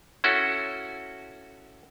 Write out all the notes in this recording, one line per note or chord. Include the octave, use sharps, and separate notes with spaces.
C#4 E4 F#4 A4